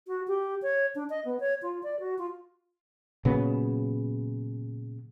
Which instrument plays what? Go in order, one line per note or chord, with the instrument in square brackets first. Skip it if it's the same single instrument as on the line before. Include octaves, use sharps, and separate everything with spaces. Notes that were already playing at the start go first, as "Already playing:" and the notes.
[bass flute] F#4
G4
C#5
D4
D#5
B3
C#5
F4
D5
F#4
F4
[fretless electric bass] A#2 C#3 F#3 B3